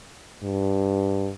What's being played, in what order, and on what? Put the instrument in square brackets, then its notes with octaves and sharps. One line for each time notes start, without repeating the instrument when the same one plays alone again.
[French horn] G2